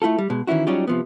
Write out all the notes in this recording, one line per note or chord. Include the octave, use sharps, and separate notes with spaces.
A3 E4 F4 A4
G3
B2 G#3
D#3 E3 C#4 E4 F#4
F#3 G3 C#4 D#4 F4 G4
C3 F3 B3